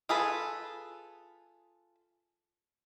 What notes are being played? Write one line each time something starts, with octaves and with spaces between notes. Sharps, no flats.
F4 G#4 A4 B4